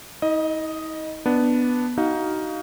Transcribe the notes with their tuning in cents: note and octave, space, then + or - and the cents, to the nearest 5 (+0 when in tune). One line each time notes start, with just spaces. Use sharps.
D#4 +45 D#5 +0
B3 +0 D4 +0
D#4 +10 F#4 +30 F5 +0